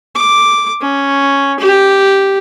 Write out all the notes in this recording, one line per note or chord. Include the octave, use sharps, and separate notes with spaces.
D6
C#4
G4